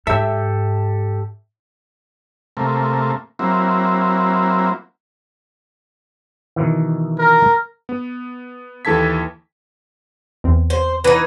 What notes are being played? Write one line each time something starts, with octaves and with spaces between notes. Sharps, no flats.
G#2 G4 A4 E5
C3 A3 A#3
F#3 A#3 C4 E4
B2 D#3 E3
A#4
B3
D#2 E3 A4 A5 G#6 B6
E2 C4
C5
E3 D#4 B4